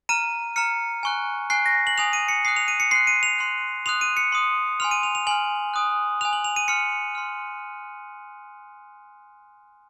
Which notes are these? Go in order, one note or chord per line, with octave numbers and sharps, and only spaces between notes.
A#5 F6 D#7
A#5 F6 C#7
G#5 C#6 F#6
G#5 C#6 F#6 C7
A#6
F#7
G#5 D#6 F#6 F7
D#7
C#7
G#5 D#6 F#6 C7
F7
D#7
C#7
C6 F#6 C7
D#7
F7
C6 F#6
C6 D#6 F#6 F7
D#7
C#7
C6 D#6 F#6
G#5 C6 F6 F7
D#7
F7
F7
G#5 C6 F6 F#7
G#5 D#6 F#6
G#5 D#6 F#6 F7
F#7
F7
D#7
C6 F6 C#7
C6 F6